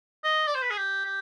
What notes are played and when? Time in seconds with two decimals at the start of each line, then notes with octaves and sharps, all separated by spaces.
0.24 D#5
0.47 D5
0.55 C5
0.62 B4
0.70 G#4
0.78 G4
1.05 G4